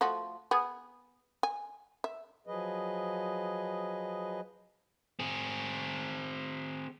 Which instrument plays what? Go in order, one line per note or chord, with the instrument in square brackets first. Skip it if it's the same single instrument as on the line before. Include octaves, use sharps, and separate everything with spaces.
[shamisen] F3 A3 F#4
B3 G#4
G#5
E5
[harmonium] F3 F#3 G#4 B4 D#5
[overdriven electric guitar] C4 G#4